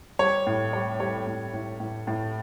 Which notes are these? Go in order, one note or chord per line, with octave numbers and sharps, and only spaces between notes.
G3 C#5
A2
G3 C#5
G3 C#5
A2
A2
A2
A2